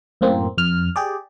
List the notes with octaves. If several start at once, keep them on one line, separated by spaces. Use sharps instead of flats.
F#2 A2 A#3 C4
F2 F6
G4 G#4 D5